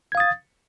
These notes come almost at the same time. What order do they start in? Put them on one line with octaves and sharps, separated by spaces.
G#6 F5 D#6 A6